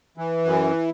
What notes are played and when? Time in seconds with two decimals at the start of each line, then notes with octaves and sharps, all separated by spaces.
0.17 E3
0.45 F#2